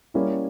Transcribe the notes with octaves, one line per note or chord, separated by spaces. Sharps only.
G3 A#3 C#4 E4